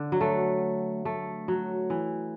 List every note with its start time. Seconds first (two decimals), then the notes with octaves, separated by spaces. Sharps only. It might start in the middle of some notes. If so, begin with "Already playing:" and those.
Already playing: D3
0.12 F#3
0.21 A3
1.05 A3
1.48 F#3
1.90 E3